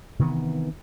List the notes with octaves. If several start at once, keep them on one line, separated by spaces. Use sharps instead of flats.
C3 D#3 E3 B3